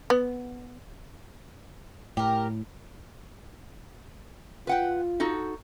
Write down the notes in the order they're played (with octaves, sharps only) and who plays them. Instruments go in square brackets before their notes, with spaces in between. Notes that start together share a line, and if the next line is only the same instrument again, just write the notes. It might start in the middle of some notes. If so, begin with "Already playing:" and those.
[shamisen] B3
[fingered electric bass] A2 [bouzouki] G4 A#4
[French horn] F4 [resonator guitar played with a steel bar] B4 F#5 G5
[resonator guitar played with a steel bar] D#4 F#4 A4